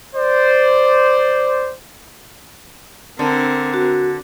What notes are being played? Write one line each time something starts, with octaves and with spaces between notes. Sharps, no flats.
C5 D5
D3 C4 A#4
F#4